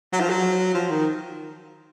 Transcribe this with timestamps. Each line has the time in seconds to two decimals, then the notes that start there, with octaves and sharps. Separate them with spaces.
0.13 F#3
0.21 F3
0.30 F#3
0.74 F3
0.90 D#3